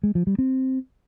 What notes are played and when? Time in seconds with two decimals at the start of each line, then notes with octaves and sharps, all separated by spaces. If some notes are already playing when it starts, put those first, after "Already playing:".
0.03 G#3
0.15 F3
0.27 G3
0.39 C4